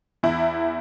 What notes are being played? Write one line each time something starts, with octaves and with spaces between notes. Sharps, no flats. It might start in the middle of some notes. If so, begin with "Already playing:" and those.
E2 E4